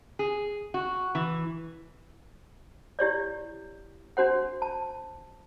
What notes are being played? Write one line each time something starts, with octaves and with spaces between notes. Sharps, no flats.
G#4
F#4
E3
E4 G4 C#5 D5
D4 F#4 C5 F#5
A5